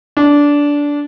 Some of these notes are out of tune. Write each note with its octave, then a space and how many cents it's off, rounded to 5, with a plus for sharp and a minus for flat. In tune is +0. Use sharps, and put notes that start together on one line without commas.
D4 -15